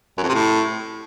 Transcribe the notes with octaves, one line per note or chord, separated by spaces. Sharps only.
F#2
F2
C3
A2